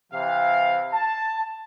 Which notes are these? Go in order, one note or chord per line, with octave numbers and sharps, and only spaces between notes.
C3 E3 F5
A5